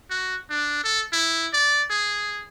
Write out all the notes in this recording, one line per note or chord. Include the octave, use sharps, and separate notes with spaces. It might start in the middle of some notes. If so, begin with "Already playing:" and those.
F#4
D4
A4
E4
D5
G#4